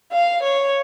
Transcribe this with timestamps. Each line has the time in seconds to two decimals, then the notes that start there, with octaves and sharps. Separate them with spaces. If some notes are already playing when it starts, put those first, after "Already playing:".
0.11 F5
0.42 C#5